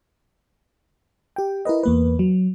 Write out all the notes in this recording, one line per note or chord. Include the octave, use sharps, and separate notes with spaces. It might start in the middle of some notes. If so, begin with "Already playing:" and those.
G4 G5
E4 A#4 B4 D#5
E2 A#3 B4
F#3